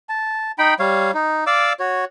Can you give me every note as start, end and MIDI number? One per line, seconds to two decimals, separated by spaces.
0.09 0.52 81
0.58 0.74 63
0.58 0.74 79
0.58 0.74 83
0.79 1.11 55
0.79 1.11 73
0.79 1.11 77
1.14 1.44 63
1.47 1.73 74
1.47 1.73 77
1.47 1.73 86
1.47 1.73 88
1.80 2.05 66
1.80 2.05 73